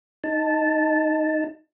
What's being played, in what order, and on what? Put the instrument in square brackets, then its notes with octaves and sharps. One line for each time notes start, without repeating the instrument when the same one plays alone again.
[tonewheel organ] D#4 A5